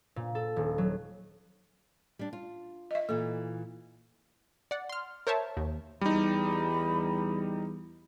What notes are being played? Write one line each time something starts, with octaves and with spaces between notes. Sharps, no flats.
A#2
A4
D#1
F#3
G3 D4
F4
D#5 E5
A#2 E3 A4
D5 F#5
C6 F6
A#4 C5 C#5 E5 A5
D#2
E2 G3 D#4 B5